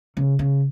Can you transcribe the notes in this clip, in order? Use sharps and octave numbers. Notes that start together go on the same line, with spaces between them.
C#3
C#3